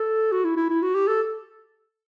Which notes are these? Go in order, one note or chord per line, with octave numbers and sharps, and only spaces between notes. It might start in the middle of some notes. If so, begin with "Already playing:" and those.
Already playing: A4
F#4
E4
E4
E4
F#4
G4
A4